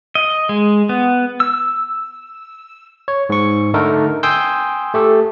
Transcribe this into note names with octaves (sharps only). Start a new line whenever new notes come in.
D#5
G#3
B3
E6
C#5
G#2 C#6
D3 A3 D#4 A4 A#4
G5 G#5 C6 D#6 E6 G6
A3 G4 A4